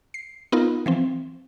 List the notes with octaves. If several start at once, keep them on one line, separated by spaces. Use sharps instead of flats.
C7
B3 D#4 F4 A#4
E3 F3 C4